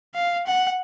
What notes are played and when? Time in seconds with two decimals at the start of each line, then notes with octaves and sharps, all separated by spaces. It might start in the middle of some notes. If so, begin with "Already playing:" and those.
0.15 F5
0.46 F#5